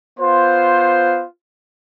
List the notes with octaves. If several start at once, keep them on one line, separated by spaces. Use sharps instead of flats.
B3 F4 C5